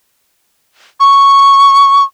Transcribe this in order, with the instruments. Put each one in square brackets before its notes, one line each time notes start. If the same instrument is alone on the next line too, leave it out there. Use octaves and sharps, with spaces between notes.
[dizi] C#6